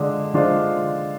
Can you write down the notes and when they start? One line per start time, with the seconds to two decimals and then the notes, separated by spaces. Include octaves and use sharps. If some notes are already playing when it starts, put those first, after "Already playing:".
Already playing: D3 G#3 D4 F4
0.34 D3 G#3 D4 F4 C5